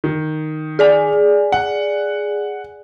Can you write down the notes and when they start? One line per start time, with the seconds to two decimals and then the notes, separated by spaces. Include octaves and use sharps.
0.04 D#3
0.79 G#4 D5 G#5
1.52 F#5